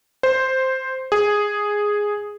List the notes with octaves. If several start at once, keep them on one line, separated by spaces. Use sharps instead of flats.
C5
G#4